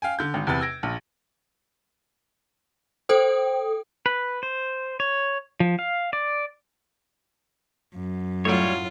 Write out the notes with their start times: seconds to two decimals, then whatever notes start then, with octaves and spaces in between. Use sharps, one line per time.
0.02 F5 G5 G#5
0.19 D3 G6
0.34 G#1
0.47 E2 C3 B4 A6
0.61 E6 G#6 A#6 D7
0.83 A#1
3.09 A4 C5 G5 D#6
4.06 B4
4.43 C5
5.00 C#5
5.60 F3
5.79 F5
6.13 D5
7.94 F#2
8.45 A2 F#3 G3 F4 C#5